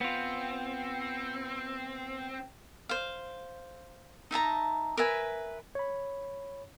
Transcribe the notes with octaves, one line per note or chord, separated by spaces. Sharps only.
B3 C4 F4
C5 F5
D#4 E5 A5 A#5
A#4 B4 E5 G#5
C#5 B5